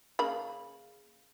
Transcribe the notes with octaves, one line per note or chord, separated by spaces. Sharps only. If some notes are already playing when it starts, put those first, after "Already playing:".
C#3 A#3 B5